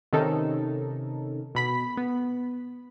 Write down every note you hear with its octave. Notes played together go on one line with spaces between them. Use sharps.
C3 D#3 C#4 D#4 A4 A#4
B2 B5 B6
B3